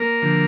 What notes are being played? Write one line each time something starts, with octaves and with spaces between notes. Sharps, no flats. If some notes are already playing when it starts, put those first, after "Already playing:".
Already playing: A#3 A#4
D3 F3